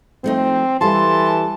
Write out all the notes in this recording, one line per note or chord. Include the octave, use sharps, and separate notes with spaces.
F3 A3 C4 D#4
E3 G3 A4 F5 A5 C6